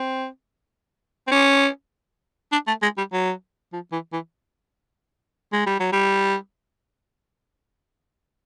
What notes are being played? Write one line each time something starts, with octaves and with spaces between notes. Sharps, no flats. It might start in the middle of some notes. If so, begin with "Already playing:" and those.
Already playing: C4
C4
C#4
D4
A3
G#3
G3
F#3
F3
E3
E3
G#3
G3
F#3
G3